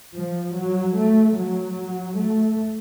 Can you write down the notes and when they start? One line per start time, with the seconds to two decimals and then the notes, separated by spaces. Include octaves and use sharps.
0.14 F3
0.55 F#3
0.96 A3
1.36 F#3
2.18 A3